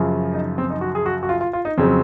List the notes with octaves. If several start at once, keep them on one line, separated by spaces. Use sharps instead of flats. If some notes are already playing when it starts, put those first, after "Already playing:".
Already playing: F#2 C#3 F3
D#4
C4
D#4
F#4
G#4
F#4
F#4
F4
F4
F4
D#4
F2 C#3 F#3 C4